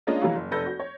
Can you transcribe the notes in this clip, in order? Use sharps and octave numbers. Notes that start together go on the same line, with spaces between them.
G#3 A#3 C#4 D4 F4 D#5
E3 F#3 G3 A#3 F#4
F#1
F1 A4 B4 G6 A#6
F#4
C#5